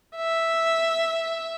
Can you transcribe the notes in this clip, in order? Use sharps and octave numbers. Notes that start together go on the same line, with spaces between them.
E5